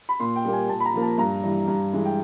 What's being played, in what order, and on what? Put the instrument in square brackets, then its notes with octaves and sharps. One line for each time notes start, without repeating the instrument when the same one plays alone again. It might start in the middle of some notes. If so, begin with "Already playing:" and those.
[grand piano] B5
A#2 C6
G5
G3 A#3
G#5
A#2 A5
B5
A#5
F3 A#3
A5
G2 A#5
E3 G3
G2
E3 G#3
G5